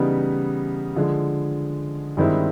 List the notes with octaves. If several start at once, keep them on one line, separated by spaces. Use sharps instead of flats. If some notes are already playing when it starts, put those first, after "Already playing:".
Already playing: C#3 E3 G3 B3 D#4
D3 F3 G#3
G2 D#3 G#3 C4 E4